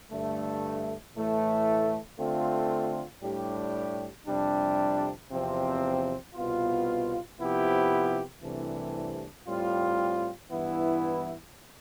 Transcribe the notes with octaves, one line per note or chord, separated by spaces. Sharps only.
G2 D3 A3
A2 E3 A3
D3 A3 C4 F4
A2 G3 D4 G4
F2 C3 G3 D4
E2 C3 F3 C4
C2 B2 B3 F4
C3 F3 B3 E4 G4
C2 C3 E3 A3 D4
A2 G3 C4 F4
G2 E3 B3 E4